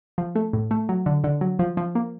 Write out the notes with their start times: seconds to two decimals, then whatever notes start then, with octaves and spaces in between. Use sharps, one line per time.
0.18 F3
0.35 A3
0.53 A2
0.71 A3
0.89 F#3
1.06 D3
1.24 D3
1.41 F#3
1.59 F3
1.77 F3
1.95 A#3